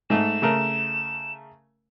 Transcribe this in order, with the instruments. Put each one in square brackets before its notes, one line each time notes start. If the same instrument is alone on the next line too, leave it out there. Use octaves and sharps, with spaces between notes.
[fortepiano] G#2 A3 [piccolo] E7
[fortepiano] C#3 A3 A#4